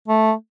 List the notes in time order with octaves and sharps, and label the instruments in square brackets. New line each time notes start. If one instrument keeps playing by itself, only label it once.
[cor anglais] A3